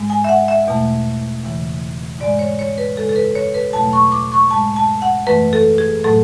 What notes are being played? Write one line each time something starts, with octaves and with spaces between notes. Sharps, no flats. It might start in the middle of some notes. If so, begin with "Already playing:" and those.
Already playing: G#2 G#3
G#5
E5
F#5
E5
E2 B2 A3
E2 C#3 E3
G#2 G#3 D5
C#5
C#5
B4
F#2 C#3 G#3 A4
A4
B4
C#5
B4
E2 B2 F#3 A3 A5
C#6
D6
C#6
G#2 G#3 A5
A5
F#5
F#2 E3 A3 B4
A4
G#4
A2 F#3 A3 A4